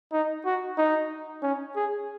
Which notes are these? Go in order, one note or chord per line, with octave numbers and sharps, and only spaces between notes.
D#4
F#4
D#4
C#4
G#4